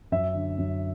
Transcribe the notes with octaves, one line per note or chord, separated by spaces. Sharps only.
F#2 E5
D3
F#2